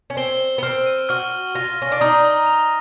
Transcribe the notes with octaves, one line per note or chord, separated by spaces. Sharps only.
C#4
C4 G7
G7
B3
C4 F6
D#7
F#4 F6
F6
F4 A#6
C#4 A#6
D4
D#4 D#6
D#6
F7